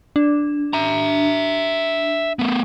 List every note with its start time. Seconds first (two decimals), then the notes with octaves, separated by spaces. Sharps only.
0.16 D4
0.73 E5 A#5
2.39 A3 B3